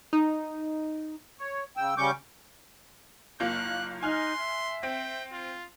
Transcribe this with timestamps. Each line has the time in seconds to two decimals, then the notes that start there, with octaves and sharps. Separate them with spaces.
0.13 D#4
1.39 C#5
1.77 C#3 G5 E6
1.98 C#3 G3 C#4 C#6 D6 G6
3.40 F#1 A#3 F4 F#6
4.03 D#4 G#5 C6 F6 F#6
4.38 E5
4.83 C4 G5
5.32 F4